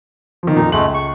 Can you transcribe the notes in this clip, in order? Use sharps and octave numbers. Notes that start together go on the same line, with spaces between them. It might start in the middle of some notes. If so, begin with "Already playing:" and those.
D#3 F3
F2 A#2 D#4
C#2 G#3 A3 F#7
C#6